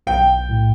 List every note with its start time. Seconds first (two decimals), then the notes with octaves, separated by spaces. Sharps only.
0.07 B1 G5
0.49 A2